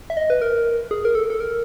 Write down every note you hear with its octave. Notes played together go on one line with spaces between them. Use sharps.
E5
D#5
B4
A#4
G#4
A#4
A4
A4
A#4